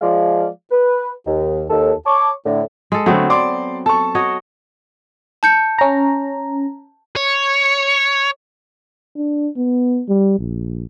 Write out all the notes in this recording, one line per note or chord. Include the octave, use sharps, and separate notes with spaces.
F3 G#3 D5 F5
B4
D#2
D#2 A4
C#5 A5 C#6 D6
A2 D3
G#3 A4
D3 F#3 A3 B3 C4
D5 C6 D6
A4 A5 C#6
F#4 C#5 D#5
A5 G6 C#7
C#4 A#5
C#5
D4
B3
G3
A#1